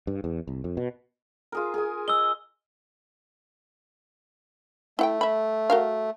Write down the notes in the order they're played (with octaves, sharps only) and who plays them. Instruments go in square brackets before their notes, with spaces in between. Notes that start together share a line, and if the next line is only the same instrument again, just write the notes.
[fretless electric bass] G2
E2
C2
F2
B2
[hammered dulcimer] F4 G#4 A#4
G#4 G#5
[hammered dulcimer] D#5 [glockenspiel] E6 G7
[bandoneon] A3 [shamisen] E4 F#5 G5
[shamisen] E5 B5
F#4 A#4 F5